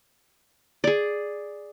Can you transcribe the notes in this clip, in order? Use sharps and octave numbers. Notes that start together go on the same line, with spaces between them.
G#4 D5